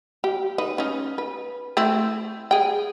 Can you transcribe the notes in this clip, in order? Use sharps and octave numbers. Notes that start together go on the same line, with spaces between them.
G4
D#4 B4
C#4 D#4
B4
A3 C4 E4
G#4 G5